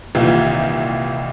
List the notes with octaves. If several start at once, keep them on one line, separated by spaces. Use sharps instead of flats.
C2 A#2 D#3 E3 F4